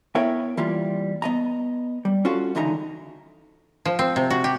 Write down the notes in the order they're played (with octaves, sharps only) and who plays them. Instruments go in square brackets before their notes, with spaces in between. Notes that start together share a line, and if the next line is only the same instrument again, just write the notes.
[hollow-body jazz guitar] B3 E4 A#4 C#5 E5 G5
E3 G3 A#3 F4
B3 D#5 A#5
G3
C#4 F4 F#4 A4
C#2 D3 E3 D#4 D#5 A#5
[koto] F3
C4
C3
F#4
G4